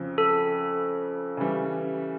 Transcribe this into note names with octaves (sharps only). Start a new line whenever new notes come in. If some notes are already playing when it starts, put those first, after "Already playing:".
Already playing: F2 C#3 F3
A4
C#3 E3 G3